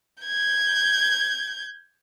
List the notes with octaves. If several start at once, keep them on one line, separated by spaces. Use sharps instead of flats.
G6 G#6